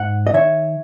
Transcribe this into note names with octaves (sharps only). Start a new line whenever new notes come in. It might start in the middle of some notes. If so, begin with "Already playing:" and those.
Already playing: G#2 F#5
D#5
D#3 C#5 E5